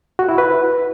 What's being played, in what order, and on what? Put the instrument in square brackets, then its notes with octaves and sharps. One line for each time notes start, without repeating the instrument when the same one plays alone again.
[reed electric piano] F#4
E4
B4